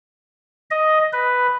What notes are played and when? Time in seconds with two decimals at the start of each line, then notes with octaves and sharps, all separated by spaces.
0.71 D#5
1.13 B4